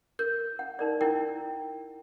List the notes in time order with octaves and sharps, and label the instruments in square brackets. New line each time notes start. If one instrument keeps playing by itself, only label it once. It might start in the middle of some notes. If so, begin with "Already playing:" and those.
[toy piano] A#4 [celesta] G6
[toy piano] F#5
D#4 A#4 D5
[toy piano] E4 A#4 [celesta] G5